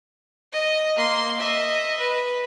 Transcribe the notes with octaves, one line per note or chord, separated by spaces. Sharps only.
D#5
A#3 C6
D#5 E5
B4